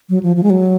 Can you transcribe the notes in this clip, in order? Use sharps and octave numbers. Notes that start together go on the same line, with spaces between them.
F#3
F3
F3
G#3
F#3